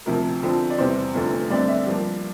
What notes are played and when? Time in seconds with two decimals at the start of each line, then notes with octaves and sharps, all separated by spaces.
0.06 D2 C3 F3 A#4
0.42 F2 D3 F3 C4
0.70 D5
0.78 E2 C3 G3 C5
1.14 F1 F2 D3 A3
1.50 G2 D3 A3 C4 D5
1.68 E5
1.86 G2 F3 A#3 G4